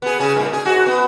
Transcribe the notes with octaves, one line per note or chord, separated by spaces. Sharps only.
B3 G#4
C#3 G#4
G2 A#2
G#4
G#2 F#4 G#4
B3